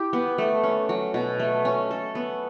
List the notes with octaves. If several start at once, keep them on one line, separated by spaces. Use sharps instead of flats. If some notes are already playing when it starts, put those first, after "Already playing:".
Already playing: E4 G4
B3
A3
C#4
F#3
B2
A3
C#4
A4
B3